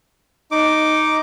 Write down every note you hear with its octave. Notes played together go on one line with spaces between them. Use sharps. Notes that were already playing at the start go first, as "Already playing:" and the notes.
D#4 D6